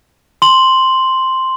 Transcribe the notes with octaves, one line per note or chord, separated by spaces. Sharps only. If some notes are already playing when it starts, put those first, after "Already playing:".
C6 F#7